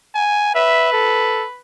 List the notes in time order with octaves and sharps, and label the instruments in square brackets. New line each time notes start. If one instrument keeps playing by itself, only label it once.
[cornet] G#5
[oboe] B4 [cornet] E5
[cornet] A4